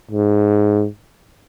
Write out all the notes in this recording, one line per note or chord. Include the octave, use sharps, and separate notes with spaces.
G#2